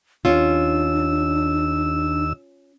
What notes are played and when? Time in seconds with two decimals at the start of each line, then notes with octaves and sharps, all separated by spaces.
0.25 D#2 C#4 D4 F4 E6